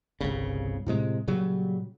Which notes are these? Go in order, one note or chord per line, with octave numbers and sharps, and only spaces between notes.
G1 C2 C#3
A2 C3 G#3
A#2 C#3 F#3 G3